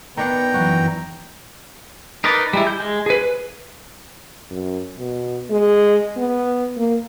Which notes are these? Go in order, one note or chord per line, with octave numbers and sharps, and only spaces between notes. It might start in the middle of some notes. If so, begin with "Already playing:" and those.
D#3 B3 D4 F#5 G5 A#5
F#2 E3 F#4
D#4 A#4 B4 D5
G3 G#3 E4
G6
G#3
G#4 B4
B4
F#2
B2
G#3
B3
A#3